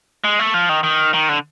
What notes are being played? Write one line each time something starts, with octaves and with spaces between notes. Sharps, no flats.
G#3
A3
F3
D#3
D#3
D#3
D3